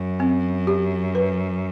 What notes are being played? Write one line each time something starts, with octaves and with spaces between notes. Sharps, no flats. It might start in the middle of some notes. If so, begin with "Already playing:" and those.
Already playing: F#2
C4
G4
B4